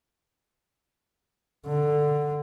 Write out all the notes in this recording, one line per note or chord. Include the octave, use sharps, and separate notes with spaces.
D3